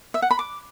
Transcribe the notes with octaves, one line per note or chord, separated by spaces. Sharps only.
E5
F#5
B5
D6